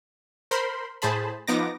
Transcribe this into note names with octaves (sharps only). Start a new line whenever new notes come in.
A#4 C5 B5 C6
A2 G#4 C5 A5 B5
F3 B3 D#4 D6 A#6